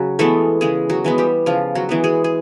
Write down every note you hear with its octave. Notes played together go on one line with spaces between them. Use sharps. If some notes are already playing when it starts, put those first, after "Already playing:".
Already playing: C#3 F#3 F#4
E3 G#3 A3 B3 A4
C#3 G#3 G#4
F#3 F#4
E3 G#3 B3
G3 G4
C#3 F3 F4
F#3 F#4
E3 G#3 B3
G#3 G#4
G#4